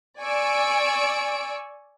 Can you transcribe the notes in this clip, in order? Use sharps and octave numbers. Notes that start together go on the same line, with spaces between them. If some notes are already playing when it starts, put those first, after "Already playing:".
D5 G#5 C#6 E6 D7